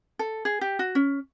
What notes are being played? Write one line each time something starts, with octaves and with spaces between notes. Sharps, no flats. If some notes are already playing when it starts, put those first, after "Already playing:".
A4
G#4
G4
F#4
C#4